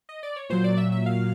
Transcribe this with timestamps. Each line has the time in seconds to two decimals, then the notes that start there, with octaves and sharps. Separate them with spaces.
0.09 D#5
0.23 D5
0.36 C#5
0.49 A#2 F#3 C5
0.64 D5
0.77 E5
0.92 E5
1.06 F5